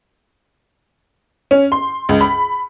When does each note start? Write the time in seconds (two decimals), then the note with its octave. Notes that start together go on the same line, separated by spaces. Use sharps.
1.51 C#4
1.72 C6
2.09 C#2
2.21 B5